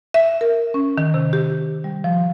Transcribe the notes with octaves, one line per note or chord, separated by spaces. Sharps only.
E5
A#4
C#4
D#3
C3
G4
G3
F3